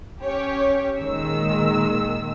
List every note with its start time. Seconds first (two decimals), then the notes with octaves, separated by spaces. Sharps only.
0.23 C#4 G4 C#5
1.00 A#2 D#3 G#3 E6